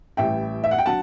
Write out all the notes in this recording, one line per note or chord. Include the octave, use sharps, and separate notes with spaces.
A1 A2 E3 G3 E5 G5
E5
F#5
G5
D3 F#3 F#5 A5